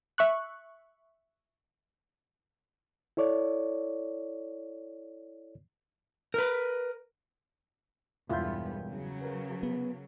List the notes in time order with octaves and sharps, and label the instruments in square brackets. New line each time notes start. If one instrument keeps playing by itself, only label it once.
[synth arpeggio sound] E5 C#6 F#6
[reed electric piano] E4 A4 C#5 D5
[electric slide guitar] A#4 B4
[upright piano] E1 G6 [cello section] E2 G2 B3 [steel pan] E4 F4
[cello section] C#3 F#3
[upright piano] A#4 B4
[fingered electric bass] B3